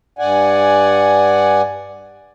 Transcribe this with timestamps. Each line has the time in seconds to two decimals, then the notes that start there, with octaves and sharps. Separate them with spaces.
0.19 G2 D5 F#5 G#5